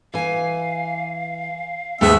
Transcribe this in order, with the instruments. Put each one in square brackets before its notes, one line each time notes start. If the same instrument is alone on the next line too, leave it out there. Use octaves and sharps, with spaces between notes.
[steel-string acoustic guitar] E3 G#5 [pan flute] F5
[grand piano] D#2 G#2 [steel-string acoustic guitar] A3 G#4 [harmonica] B3 E5 [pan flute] G5